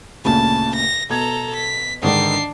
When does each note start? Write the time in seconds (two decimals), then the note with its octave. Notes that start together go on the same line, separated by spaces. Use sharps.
0.25 D2 A#2 C#3 A5
0.76 A#6
1.10 B2 A4 A#5 G#6
1.56 B6
2.02 G#2 D3 D#3 D4 C7